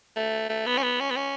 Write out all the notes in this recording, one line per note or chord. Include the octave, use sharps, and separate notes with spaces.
A3
A3
B3
C#4
B3
C#4
B3
C#4